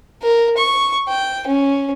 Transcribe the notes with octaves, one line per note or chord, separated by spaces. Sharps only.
A#4
C#6
G5
C#4